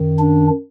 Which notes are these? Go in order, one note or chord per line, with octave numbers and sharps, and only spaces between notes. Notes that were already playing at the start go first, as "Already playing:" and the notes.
Already playing: F#2 D#3
D4